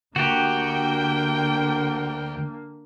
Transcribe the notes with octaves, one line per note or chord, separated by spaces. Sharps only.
D2 D3 A#3 F#4 G4 G5